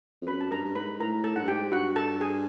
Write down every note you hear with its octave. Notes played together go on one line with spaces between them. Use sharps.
F2
F#2 B4 B5
A5
G2 A#4 A#5
G2
G#2 B4 B5
A2 A#4 A#5
A4 A5
G#2 F#5
G2
G#2 G4 G5
G2 F#4 F#5
A4 A5
G#4 G#5